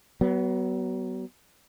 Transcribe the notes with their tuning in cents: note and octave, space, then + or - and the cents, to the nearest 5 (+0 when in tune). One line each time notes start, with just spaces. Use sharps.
F#3 +30 B3 -5